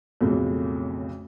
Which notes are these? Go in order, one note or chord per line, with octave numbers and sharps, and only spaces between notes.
B1 F2 A2 C#3